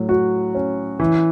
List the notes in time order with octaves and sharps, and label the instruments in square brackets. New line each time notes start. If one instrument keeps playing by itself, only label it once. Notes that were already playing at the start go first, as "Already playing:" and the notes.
Already playing: [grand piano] A2 F#3
F#4
C#4
E3